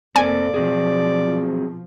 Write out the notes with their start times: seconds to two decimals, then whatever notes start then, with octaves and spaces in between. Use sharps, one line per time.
0.16 F1 A#3 C4 A4 D5 G#5
0.54 B2 F3 F#3 C4 G#4